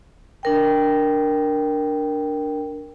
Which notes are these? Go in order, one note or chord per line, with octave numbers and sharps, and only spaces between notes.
D4 A#4 G5